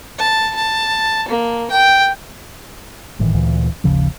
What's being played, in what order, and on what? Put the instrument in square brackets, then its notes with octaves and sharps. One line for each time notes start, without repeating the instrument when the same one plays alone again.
[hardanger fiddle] A5
A5
A#3
G5
[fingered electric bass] G1 A2 D#3 E3
D2 A#2 E3
G#1 D#2 C#3 F3